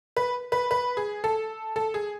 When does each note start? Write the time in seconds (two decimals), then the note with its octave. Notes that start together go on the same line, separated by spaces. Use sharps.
0.17 B4
0.52 B4
0.71 B4
0.97 G#4
1.24 A4
1.76 A4
1.94 G#4